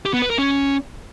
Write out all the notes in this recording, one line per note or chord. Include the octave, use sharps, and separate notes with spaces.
G4
B3
B4
A#4
C#4